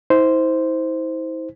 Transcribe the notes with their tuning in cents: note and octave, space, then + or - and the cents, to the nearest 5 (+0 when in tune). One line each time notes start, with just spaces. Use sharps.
E4 -40 C5 -5